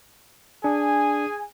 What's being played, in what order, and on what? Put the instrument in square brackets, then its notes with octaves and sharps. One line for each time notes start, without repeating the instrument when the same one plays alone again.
[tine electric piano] D4 [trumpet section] G#4 G#5